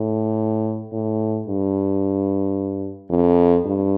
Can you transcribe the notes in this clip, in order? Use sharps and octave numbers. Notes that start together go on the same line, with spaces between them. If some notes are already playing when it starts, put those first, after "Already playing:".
Already playing: A2
A2
G2
F2
G2